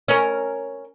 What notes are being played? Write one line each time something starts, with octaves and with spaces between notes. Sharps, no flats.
C#4 A#4